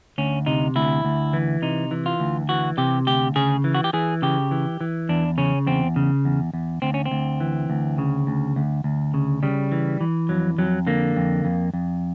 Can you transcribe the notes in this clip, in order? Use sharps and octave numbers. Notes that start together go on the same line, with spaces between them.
D2 C#4
C3 D#4
D2 E4
D2
E3
C3 D#4
E3
F4
D2
E3 F#4
C3 G4
D2 G4
C#3 G#4
E3
F#4
G4
E3 G#4
C#3 G4
E3
E3
E2 D4
C#3 C#4
E2 C4
C#3
E2
E2
D2 C4
C#4
C4
D2
E3
D2
C#3
D2
D2
D2
C#3
C#3 G3
E3
E3
F2 F#3
F2 F#3
D3 A#3
F2
F2
F2